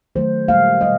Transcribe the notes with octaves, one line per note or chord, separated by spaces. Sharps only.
D#3 F#3 A3 C5
A#2 G3 A#3 F5
B2 G3 D#5